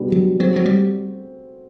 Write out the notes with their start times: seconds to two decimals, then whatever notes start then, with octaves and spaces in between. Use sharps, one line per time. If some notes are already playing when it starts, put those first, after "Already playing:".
Already playing: B2 G3 B3 D4 F#4
0.12 F#3
0.39 F#3 A3 C4 F#4
0.56 F#3
0.66 G3